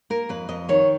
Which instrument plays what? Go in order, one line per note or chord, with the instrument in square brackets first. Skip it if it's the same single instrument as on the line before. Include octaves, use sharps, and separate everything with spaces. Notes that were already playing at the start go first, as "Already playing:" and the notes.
[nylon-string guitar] A#3 A#4
F2 B4
F2 D#5
D#3 C#5